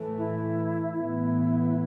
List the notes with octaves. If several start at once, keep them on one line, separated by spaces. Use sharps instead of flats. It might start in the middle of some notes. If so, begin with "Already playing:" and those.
Already playing: A2 E3 A3
E4
A2 E3 B3 E4
E4